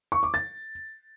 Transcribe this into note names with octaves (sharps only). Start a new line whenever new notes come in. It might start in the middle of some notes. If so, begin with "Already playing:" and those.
C#6
D6
A6